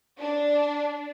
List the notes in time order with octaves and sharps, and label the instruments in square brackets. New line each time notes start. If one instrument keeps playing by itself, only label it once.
[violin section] D4